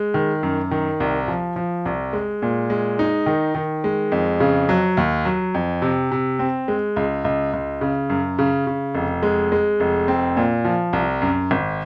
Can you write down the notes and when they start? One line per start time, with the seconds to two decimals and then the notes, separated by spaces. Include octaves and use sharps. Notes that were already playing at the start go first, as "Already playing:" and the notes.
Already playing: G#3
0.14 D#3
0.43 F#2
0.71 D#3
1.00 C2
1.28 F3
1.56 F3
1.86 C2
2.13 G#3
2.42 A#2
2.70 G#3
2.99 D#4
3.26 D#3
3.55 D#3
3.84 G#3
4.12 F2
4.40 C#3
4.69 F#3
4.97 D#2
5.25 F#3
5.54 F2
5.82 C3
6.11 C3
6.39 C4
6.68 G#3
6.96 C#2
7.25 C#2
7.53 C#2
7.81 C#3
8.10 F#2
8.39 C#3
8.67 C#3
8.95 F1
9.23 G#3
9.52 G#3
9.80 F1
10.08 C4
10.37 A#2
10.65 F3
10.93 C2
11.22 F#2
11.51 G#1